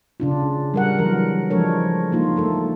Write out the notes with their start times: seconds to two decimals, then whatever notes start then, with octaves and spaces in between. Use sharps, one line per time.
0.20 C#3 D4 F4
0.74 G3 A#4 F#5
0.99 E3 F#3 A#4
1.50 F3 G#3 D4 A4 A#4 C#5
2.12 A#3 D#4 F4
2.36 A3 A#3 A4